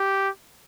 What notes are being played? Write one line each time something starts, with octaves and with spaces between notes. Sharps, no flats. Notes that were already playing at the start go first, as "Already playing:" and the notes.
Already playing: G4